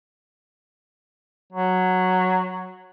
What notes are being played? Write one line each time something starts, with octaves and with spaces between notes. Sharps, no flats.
F#3